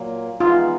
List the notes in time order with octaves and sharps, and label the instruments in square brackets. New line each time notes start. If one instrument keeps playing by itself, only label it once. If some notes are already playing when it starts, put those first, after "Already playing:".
Already playing: [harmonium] A#2 F#3 A#3
[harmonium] E3 G#3 B3 D#4 [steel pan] F4